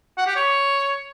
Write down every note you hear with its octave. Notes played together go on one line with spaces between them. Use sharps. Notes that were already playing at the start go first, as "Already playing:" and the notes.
F#5
G4
C#5